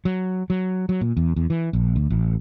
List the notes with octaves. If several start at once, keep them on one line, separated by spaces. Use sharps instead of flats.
F#3
F#3
F#3
A#2
E2
E2
E3
A#1
D2
A1